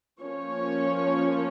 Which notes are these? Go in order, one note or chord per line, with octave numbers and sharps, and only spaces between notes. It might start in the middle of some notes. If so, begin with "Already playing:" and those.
F3 A#3 C#4 C#5